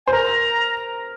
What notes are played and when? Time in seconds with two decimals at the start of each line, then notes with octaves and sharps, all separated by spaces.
0.06 C5 G#5
0.13 A#4 A#5